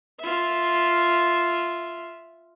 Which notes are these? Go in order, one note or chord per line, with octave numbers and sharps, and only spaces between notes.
F4 E5